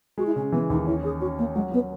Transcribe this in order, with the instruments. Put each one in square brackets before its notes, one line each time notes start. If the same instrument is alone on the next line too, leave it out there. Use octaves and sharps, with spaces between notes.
[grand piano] G#3 [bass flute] F#4
[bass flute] E4
[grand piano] C#3 [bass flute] C#4
[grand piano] E3 [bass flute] B3
[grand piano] D#2 [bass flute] D#4
[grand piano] C#4 [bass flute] E4
[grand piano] C#4 [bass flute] G#4
[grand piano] C#4 [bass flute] F#4
[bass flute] A#3 [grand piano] C#4
[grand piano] F#3 [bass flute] G#3
[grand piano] F#3 [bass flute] B3